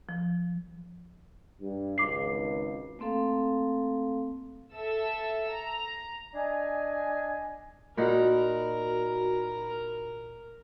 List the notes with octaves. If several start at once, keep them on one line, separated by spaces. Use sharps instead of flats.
F3
G2
G#1 C#2 D6 C7
A3 A#3 C4 A4 F5
A4 E5 E6
A#5
D4 D#5 G#5
A#2 D#4 F#4 A#4 F#5 B5